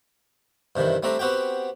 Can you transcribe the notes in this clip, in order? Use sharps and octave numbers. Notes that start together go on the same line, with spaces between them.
G2 C3 D#3 E3
G3 A3 C4 D4 A#5
B3 C4 F#4 G4 G5